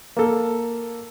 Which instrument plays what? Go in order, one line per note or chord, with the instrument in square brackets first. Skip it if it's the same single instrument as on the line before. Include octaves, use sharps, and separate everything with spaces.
[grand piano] A#3 A4